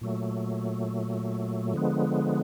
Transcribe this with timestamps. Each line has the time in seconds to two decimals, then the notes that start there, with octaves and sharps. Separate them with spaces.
0.01 A#2 F#3 A3
1.74 D3 F3 G#3 B3